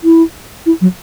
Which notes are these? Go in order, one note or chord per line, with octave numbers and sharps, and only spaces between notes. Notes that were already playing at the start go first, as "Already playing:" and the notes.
E4
E4
F#3